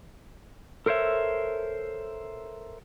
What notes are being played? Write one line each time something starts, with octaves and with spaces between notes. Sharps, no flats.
A4 A#4 C5 C#5 E5